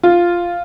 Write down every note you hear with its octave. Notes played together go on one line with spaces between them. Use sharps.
F4